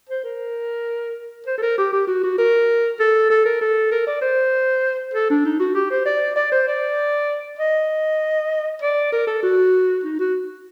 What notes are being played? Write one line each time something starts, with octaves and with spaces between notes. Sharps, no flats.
C5
A#4
C5
A4
A#4
G4
G4
F#4
F#4
A#4
A4
A4
A#4
A4
A#4
D5
C5
A4
D4
D#4
F#4
G4
C5
D5
D5
C5
D5
D#5
D5
A#4
A4
F#4
D#4
F#4